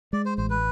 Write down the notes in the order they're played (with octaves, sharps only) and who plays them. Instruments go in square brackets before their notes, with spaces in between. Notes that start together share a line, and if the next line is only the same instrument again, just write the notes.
[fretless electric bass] G#3 [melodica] D5
[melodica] C5
[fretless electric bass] A1 [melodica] C5
[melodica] B4